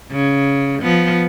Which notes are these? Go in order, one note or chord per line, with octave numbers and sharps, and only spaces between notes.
C#3
F3 B3